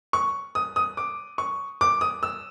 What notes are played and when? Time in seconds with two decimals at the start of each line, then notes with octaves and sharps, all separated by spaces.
0.13 C#6
0.55 D#6
0.76 D#6
0.97 D6
1.38 C#6
1.81 D6
2.01 D#6
2.23 E6